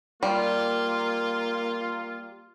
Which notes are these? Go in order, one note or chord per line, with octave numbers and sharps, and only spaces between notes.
G3 A#3 F4